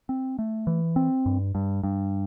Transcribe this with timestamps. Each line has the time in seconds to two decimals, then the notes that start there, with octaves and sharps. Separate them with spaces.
0.09 C4
0.39 A3
0.67 E3
0.96 C4
1.26 G2
1.55 G2
1.83 G2